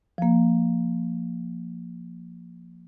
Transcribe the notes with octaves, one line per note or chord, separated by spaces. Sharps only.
F3 A#3